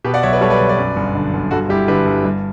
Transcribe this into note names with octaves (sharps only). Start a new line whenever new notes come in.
B2 G4 B4
D5 F#5
B1 C#5 E5
B4 D5
G3 A4 C#5
B4 D5
B1
B4 D5
F#2
G1
D3
G1
G2 F#4 A4
G3 E4 G4
D3 G4 B4
G1
G2